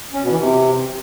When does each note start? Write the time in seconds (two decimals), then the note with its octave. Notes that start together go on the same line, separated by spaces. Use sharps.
0.13 C#4
0.22 B2
0.30 E3
0.39 C3